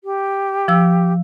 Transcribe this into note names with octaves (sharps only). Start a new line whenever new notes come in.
G4
F3 E6